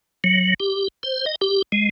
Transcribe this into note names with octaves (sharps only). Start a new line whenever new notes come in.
F#3
G4
C5
D#5
G4
G#3